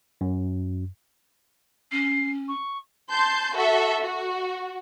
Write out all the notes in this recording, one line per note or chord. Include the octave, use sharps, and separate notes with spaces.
F#2
C#4 C7
C#6
A5 C6 G6
F#4 A4 E5
F#4